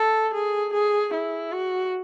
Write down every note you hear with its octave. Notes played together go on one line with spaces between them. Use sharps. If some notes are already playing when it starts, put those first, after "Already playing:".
Already playing: A4
G#4
G#4
E4
F#4